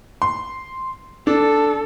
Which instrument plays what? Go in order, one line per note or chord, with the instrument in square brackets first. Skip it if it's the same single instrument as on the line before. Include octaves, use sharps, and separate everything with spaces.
[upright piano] C6
[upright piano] D4 [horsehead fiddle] A4